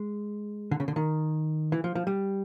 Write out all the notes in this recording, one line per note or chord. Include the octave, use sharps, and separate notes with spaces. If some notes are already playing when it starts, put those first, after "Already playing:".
Already playing: G#3
D3
C#3
D3
D#3
E3
F3
F3
G3